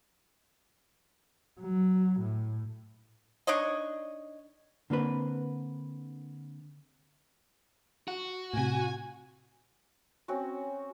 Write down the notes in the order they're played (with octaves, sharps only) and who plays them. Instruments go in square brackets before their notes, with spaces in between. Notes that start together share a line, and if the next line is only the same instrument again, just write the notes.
[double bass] F#3
A2
[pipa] D4 D#4 C#5 D#5
[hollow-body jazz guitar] D3 A#3 C4 B4
[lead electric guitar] F#4
[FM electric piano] A2 C3 [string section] G#5
[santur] C4 C#4 F#4